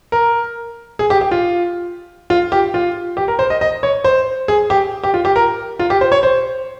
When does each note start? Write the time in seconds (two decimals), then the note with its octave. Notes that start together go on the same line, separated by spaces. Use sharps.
0.12 A#4
0.99 G#4
1.10 G4
1.21 G4
1.31 F4
2.30 F4
2.52 G4
2.74 F4
3.17 G4
3.28 A#4
3.39 C5
3.50 D#5
3.61 D#5
3.83 C#5
4.04 C5
4.48 G#4
4.70 G4
5.03 G4
5.14 F4
5.25 G4
5.36 A#4
5.79 F4
5.90 G4
6.01 C5
6.12 C#5
6.23 C5